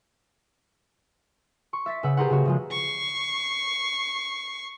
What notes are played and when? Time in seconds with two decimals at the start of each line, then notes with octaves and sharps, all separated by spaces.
1.73 C6 C#6
1.86 E5 A6 B6
2.03 C#3 B4 E5 F#5 E6
2.17 G4 G#4 A#4 C5 F#5
2.30 C#3 A#3 F#4
2.45 C#3 F3 G#3
2.71 C#6 C7